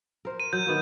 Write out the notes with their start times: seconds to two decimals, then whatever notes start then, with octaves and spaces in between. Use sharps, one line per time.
0.25 A#4 C5
0.40 D#7
0.53 F#3 G6
0.67 D#3 B3 F#4